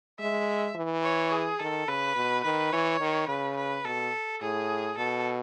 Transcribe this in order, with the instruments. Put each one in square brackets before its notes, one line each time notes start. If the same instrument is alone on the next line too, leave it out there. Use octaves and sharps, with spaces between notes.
[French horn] G#3 [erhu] E5
[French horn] E3
[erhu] C#5
G#4
[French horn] D#3 [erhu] A4
[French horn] C#3 [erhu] B4
[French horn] B2
[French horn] D#3 [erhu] B4
[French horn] E3 [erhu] C#5
[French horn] D#3
[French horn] C#3 [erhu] B4
[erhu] B4
[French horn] B2 [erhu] A4
[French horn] A2 [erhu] G#4
[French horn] B2 [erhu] A4